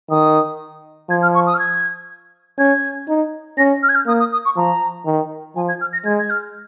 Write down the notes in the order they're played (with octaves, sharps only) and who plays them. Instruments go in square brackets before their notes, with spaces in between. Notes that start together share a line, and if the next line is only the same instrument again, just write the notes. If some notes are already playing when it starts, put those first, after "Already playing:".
[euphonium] D#3 [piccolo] D#6
[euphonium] F3 [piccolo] G#6
[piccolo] F6
C#6
D#6
F6
G#6
[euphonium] C#4 [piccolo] G#6
[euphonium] D#4
[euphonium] C#4 [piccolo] A#6
[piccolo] F6
G#6
F6
[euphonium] A#3 [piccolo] D#6
[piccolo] D#6
D#6
C#6
[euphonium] F3 [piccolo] A#5
[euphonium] D#3
[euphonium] F3 [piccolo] G#5
[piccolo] G#6
F6
A#6
[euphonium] G#3 [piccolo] G#6
[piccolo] G#6
F6